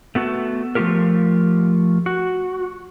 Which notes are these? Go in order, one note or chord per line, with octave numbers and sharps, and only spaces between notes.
A3 B3 F#4 A4
F3 A3 A#3 F4 G4 A#4
F#4